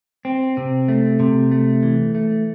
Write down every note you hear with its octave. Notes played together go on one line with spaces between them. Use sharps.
C4
C3
A3
C3
A3
E3
A3